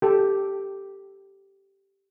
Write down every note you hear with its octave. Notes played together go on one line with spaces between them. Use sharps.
G4 A4